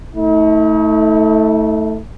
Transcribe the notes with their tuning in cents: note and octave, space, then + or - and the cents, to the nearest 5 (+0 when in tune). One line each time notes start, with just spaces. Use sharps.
A3 +0 D#4 +45